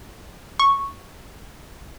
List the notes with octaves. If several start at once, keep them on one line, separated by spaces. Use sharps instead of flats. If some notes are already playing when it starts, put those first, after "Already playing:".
C#6